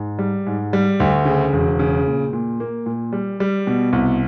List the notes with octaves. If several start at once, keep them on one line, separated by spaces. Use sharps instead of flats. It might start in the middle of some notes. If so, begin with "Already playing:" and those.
Already playing: G#2
G3
G#2
G3
D2
C#3
E1
C#3
A#2
A#2
A#3
A#2
G3
G3
B2
C2